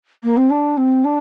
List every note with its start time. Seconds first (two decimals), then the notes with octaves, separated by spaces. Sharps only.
0.23 A#3
0.37 C4
0.50 D4
0.77 C4
1.04 D4